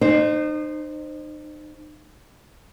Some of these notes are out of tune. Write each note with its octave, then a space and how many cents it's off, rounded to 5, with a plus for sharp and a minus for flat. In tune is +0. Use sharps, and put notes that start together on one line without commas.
D#4 -35 C5 +0